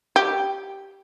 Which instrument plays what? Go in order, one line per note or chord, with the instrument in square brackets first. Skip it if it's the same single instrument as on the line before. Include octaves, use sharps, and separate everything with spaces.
[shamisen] G4